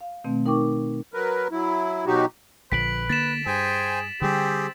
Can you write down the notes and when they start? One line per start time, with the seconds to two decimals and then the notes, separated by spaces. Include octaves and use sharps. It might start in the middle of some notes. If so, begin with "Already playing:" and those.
0.01 F5
0.24 B2 D#3 A3 C4
0.46 D#4 A#4 G5 C#6 D6
1.14 F#3 A#4 B4
1.51 F#3 E4
2.06 B2 F#3 D#4 F#4 G4
2.72 A#1 D3 F3 B4 B6 D7 F#7
3.09 D3 A#3 A6 B6 E7
3.46 G2 G#4 C5 G5 G#5
4.22 D3 G3 C4 G4 G#4